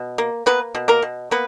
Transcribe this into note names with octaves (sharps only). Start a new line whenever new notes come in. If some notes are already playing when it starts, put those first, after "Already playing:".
Already playing: B2
A#3
A#3 B3 B4
B2
A#3 A#4
B2
A#3 B3 B4